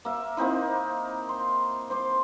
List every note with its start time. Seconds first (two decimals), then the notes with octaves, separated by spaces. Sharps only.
0.05 A#3 E5
0.37 A#3 C4 D#4 E4
1.29 C6
1.90 C5 C6 D6